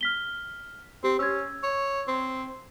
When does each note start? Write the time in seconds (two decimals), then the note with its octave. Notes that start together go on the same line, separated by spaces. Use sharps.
0.01 F6 B6 G7
1.04 C4 G4
1.19 C#4 E6 G#6
1.64 C#5
2.08 C4